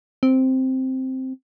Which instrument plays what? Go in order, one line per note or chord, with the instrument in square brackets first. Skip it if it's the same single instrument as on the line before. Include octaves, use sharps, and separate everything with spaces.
[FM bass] C4